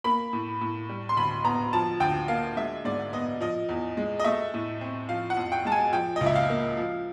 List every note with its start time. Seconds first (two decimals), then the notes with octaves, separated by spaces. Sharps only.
0.04 A#3 B5
0.33 A2
0.61 A2
0.89 G3
1.09 C6
1.17 D2 B5
1.45 B3 A#5
1.73 F3 A5
2.00 D2 G5
2.28 A#3 F5
2.57 G#3 E5
2.85 G#2 D5
3.13 B3 D#5
3.40 F3 D#5
3.69 E2
3.97 G#3
4.20 D#5
4.24 A3 E5
4.54 A2
4.81 C4
5.09 F3 F5
5.30 F#5
5.37 F2
5.52 G5
5.65 G#3 A5
5.72 G#5
5.93 F3 G5
6.16 D#5
6.21 C#2
6.26 E5
6.35 F5
6.50 A#3
6.77 F3